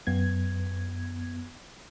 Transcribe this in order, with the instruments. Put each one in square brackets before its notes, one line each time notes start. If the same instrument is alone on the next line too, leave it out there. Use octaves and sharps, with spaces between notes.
[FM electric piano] F#2 B3 G#6